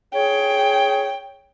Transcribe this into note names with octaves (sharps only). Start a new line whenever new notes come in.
G#4 C#5 G5